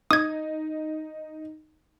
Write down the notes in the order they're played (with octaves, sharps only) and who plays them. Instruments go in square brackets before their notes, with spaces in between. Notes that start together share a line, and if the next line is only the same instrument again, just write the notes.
[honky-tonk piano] D#4 [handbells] D#6 G#6